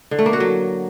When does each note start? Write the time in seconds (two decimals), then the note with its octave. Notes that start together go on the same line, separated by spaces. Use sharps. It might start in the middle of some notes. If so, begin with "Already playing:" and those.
0.11 D3
0.19 A3
0.26 A#3
0.33 F#4
0.40 F#3